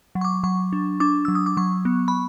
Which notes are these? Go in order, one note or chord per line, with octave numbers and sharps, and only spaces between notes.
F#3
C#6
D6
F#3 C#6
D4
D4 D6
F#3 E6
D#6
D6
F#3 C#6
B3
B5